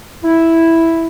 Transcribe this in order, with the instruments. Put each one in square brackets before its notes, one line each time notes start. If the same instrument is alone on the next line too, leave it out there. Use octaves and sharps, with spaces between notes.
[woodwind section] E4